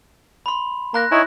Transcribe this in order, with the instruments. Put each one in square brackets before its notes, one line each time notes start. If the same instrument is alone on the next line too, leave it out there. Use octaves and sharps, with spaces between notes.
[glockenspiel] B5 C6
[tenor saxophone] A#3 [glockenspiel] A#5 F#6 A#6
[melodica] D#4 C#5 G#5 [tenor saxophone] E4